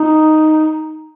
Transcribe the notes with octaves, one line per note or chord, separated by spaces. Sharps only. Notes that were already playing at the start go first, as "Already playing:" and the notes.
Already playing: D#4